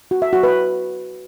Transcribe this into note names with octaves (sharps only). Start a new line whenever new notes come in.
F#4
E5
F#4
B4